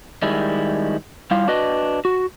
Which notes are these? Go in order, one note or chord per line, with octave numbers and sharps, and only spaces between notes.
D#3 G3 G#3 E4
G3 E4 F4 F5
D4 F#4 B4 D#5
F#4